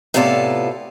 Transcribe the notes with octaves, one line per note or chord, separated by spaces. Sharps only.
A2 C3 B3 F4 A4 D5